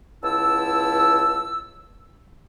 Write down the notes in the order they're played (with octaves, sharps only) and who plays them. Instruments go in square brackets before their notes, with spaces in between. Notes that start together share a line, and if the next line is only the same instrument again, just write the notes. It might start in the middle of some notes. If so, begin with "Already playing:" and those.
[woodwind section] C#2 B3 E4 A5 E6